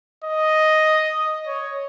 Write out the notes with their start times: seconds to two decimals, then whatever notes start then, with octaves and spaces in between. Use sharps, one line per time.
0.24 D#5
1.47 C#5